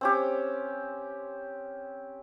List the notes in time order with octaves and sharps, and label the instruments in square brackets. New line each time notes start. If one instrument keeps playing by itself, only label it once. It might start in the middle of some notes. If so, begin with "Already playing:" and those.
[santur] C4 C#4 G4